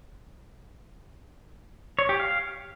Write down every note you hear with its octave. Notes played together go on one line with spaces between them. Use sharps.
C#5
G4
F5